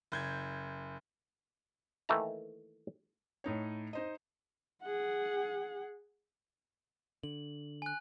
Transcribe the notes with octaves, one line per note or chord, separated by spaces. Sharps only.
F#1 G6 G#6
D#3 E3 A3 A#3 A5 A#5
A2 D#4 C#5
D#4 C5 D#5
G#4 F#5
D3 F#7
G#5 F#6